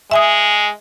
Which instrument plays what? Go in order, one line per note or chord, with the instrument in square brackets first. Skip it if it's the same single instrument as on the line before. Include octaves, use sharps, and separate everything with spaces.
[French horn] G#3 [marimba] E5 G#5 D#6